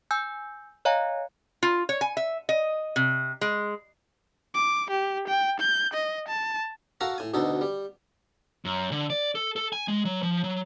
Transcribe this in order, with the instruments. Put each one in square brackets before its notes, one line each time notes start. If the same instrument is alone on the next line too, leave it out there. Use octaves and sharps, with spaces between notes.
[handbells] G#5 E6 G6
C#5 D#5 F5 G#5 A#5
[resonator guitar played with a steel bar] F4
C#5
G#5
E5
D#5
C3
G#3
[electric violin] D6
G4
G5
G6
D#5
A5
[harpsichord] F#4 A4 A#4 F5 A5 A#5
A2 G#5
D2 B2 D#4 A4
G3
[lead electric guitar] F#2
D3
D5
A4
A4
G#5
G#3
F#3
F3
F#3